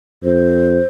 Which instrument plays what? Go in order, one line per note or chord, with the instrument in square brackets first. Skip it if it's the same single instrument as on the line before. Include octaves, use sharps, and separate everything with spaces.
[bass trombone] F2 [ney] C5